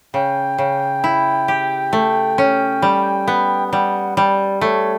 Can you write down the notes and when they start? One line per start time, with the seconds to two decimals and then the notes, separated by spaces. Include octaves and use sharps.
0.14 C#3 G5
0.58 C#3
1.04 E4
1.48 G4
1.93 A3
2.38 C#4
2.82 G3
3.28 B3
3.68 G5
3.72 G3 F#5
4.17 G3 D5
4.61 A3 C#5